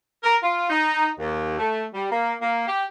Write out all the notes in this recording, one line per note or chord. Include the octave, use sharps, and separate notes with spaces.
A#4
F4
D#4
D#2
A3
G3
A#3
A#3
G4